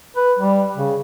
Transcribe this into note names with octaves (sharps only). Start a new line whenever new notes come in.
B4
G3
C#3